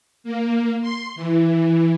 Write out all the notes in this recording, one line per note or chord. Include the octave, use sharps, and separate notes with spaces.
A#3
C6
E3